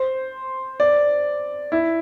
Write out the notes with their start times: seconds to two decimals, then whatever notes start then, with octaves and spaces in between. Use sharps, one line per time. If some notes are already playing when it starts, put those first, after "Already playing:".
Already playing: C5
0.80 D5
1.72 E4